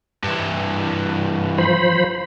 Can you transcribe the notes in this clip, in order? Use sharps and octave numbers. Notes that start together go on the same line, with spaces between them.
G2 E3
F3 C5 B5